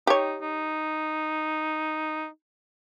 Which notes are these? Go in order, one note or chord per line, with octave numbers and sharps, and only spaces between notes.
D#4 G4 C#5
D#4